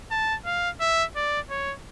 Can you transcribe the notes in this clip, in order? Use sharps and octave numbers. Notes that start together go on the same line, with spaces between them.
A5
F5
E5
D5
C#5